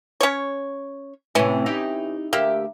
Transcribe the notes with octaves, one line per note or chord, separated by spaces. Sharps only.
C#4 C#5
A2 C3 E3 C#4
D#4 E4 G4
D2 A#3 G4 E5